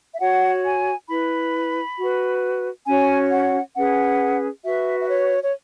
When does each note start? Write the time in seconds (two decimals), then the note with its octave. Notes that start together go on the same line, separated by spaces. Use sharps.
0.14 E5
0.20 F#4 C#5 F#5
0.64 G#5
1.09 E4 B4 B5
1.97 F#4
2.03 B4
2.86 C#4 F#4 C#5 G#5
3.31 F#5
3.76 C#4 G#4 B4 F#5
4.64 F#4 B4 E5
5.01 E5
5.09 C#5
5.43 C#5